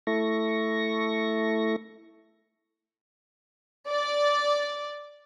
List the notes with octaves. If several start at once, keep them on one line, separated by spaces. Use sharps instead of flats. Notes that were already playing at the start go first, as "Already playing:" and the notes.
A3 E4 A4 C#6 A#6
D5